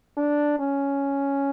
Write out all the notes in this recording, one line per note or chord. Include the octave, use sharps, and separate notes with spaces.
D4
C#4